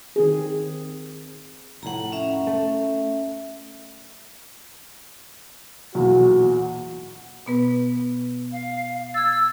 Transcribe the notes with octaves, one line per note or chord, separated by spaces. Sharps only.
D#3 C4 G#4
F1 A2 F#5 A#5
C#4 E5
A3
B1 E2 A#2 F#4
B2 B3 B4
F5
E6 G#6 A6